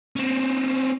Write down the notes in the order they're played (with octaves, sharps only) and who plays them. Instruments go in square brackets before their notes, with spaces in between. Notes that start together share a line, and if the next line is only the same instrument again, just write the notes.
[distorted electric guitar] C4 C#4